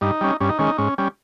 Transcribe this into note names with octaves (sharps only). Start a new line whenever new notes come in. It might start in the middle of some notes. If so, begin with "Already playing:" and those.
G2 D#4
G3 C#4
G2 C#4
D#4
D#3 G#3 C#4
D#4
G#2 C#4
G3 C#4